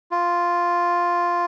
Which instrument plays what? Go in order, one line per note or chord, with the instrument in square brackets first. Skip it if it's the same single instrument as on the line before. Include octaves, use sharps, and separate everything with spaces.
[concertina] F4